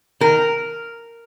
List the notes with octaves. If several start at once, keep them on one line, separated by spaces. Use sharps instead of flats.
D#3 A#4